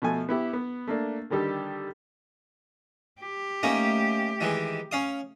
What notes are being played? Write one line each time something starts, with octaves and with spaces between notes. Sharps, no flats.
B2 F3 A3 G#5
B3 E4 G4
B3
A3 A#3 D4
D3 D#3 G3 G4 A4
G4
A3 A#3 C#4 D#4
D#3 E3 G#3
C#4 F5 D#6